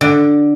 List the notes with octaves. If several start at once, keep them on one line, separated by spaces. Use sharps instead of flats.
D3